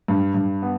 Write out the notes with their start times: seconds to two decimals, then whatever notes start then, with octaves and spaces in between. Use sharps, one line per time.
0.08 G2
0.34 G2
0.62 B3